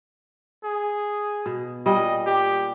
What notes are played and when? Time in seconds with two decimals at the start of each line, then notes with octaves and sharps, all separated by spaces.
0.64 G#4
1.46 B2
1.86 A#2 G3 D#5
2.26 G4